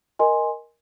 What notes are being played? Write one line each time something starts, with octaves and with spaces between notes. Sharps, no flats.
A#4 D#5 G#5 C6